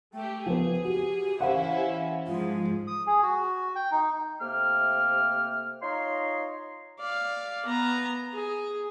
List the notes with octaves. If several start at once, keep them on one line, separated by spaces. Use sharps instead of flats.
A3 G4 G5
F3 B3 G#4
F#4 G4
E3 C#4 E4 C5 F5 F#5
G#2 F3 G#3 F4
D#6
G#4
F#4
G5
D#4
C3 A3 A#3 G5 F6
D#4 F4 C#5 A#5 C6
D5 F5
B3 A#5
G#4